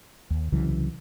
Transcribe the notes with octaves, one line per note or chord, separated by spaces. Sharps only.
D#2
C2 C#3 E3 F#3